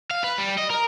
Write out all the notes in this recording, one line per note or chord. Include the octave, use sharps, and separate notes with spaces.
F5
B4
G3
D#5
A#4